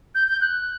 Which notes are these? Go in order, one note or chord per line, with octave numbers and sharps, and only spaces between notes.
G6
G6
F#6